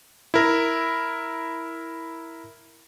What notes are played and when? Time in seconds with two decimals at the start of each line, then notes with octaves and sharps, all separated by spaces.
0.34 E4 A#4